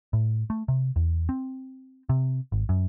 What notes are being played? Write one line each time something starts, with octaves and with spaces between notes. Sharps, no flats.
A2
A3
C3
E2
C4
C3
G#1
F#2